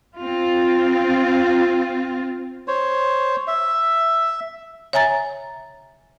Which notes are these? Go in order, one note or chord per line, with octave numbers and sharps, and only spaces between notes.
C4 F4
C5 C#5
E5
C#5 E5 G#5 A#5 A6